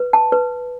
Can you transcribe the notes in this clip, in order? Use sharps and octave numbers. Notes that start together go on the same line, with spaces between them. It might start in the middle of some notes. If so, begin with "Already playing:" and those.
Already playing: B4
A5
B4